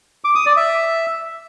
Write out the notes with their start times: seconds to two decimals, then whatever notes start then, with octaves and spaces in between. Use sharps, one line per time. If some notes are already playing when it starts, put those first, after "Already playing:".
0.24 D6
0.35 D#6
0.46 D5
0.57 E5